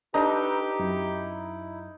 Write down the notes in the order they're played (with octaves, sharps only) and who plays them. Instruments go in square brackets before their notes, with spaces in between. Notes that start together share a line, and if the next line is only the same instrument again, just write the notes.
[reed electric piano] D4 A#5 [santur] D#4 [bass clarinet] G4 [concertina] A4 B4
[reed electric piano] F#2 [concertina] E4